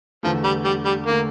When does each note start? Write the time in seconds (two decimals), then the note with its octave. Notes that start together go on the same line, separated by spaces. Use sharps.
0.23 E2 D3 F3 A3
0.44 G3
0.65 G3
0.85 G3
1.06 D3 A3 A#3